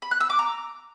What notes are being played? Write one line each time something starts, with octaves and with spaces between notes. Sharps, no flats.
B5
F#6
E6
D6
A#5